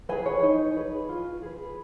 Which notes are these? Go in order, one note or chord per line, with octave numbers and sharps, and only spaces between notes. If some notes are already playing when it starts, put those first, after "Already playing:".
G#4 B4 G#5
C#5
D#4
G#4 B4
F4
G#4 B4